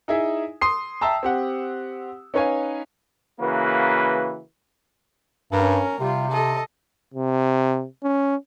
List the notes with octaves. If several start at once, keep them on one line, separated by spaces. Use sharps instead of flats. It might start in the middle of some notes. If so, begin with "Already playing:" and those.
D#4 E4 G#4 E5
C6 D#6 C7
E5 G5 A5 A#5 E6
C4 G4 F#5
C#4 D#4 B4 C#5 F5 G#5
C#3 E3 A#3 F#4 A#4 B4
G2 C#4 A#4
C3 G3 F4
A4 D#5
C3
C#4